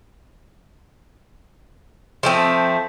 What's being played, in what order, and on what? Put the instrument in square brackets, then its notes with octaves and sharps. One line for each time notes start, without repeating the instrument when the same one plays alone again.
[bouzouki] F3 A3 C4